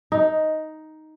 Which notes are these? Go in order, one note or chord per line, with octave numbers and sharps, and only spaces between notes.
D#4